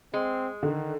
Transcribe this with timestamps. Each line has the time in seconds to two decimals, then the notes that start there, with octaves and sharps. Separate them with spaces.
0.14 G#3 C4
0.63 D3 D#3